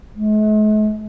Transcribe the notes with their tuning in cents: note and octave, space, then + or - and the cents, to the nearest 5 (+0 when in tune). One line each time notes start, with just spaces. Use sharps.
G#3 +45